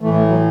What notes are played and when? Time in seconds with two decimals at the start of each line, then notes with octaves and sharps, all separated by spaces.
0.01 A2 E3 A3
0.14 A3
0.27 F#3